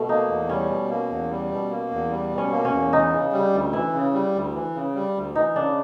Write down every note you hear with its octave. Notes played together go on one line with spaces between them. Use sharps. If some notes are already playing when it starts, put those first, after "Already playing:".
Already playing: B2 A3
A#3 D#4
E2
G3 C#4
B2
A#3
E2
G3
B2
A#3
E2
G3
B2
C#4
A#3
C#4
E2
E3 D#4
C#3
G3
D2
E3 E4
C#3
G3
D2
E3
C#3
G3
D2
E3 D#4
C#3 D4